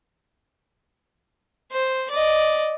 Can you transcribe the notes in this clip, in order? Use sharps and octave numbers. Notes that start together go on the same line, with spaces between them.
C5
D5 D#5